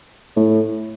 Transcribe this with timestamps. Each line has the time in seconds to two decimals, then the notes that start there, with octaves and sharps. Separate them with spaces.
0.36 A2